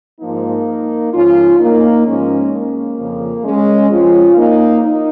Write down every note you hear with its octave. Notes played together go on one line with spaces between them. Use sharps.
G#2 F3 A#3 D#4
G#2 F3 C#4 F4
A#3 D#4
G#2 F3 G#3 C#4
A#3
F2 C#3 F3
G#3 C#4
F2 F3 C#4 F4
A#3 D#4
D#4